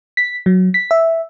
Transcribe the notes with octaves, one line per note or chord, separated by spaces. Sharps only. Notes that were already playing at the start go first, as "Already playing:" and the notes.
B6
F#3
B6
E5